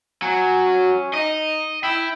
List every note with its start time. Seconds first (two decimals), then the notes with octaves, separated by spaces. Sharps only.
0.22 F#3 G#5
0.65 C#4
1.14 D#4 D#5
1.84 E4 G5